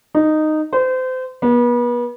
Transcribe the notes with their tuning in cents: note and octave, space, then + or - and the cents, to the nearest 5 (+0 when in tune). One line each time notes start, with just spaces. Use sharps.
D#4 -10
C5 -30
B3 -35